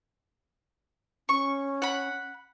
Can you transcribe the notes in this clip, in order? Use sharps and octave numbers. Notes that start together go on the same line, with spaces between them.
C#4 C#6
F#5 B5